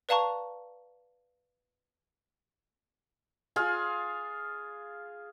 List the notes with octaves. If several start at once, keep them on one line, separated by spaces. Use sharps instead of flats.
B4 D5 F5 A5 A#5 C#6
F4 G#4 F5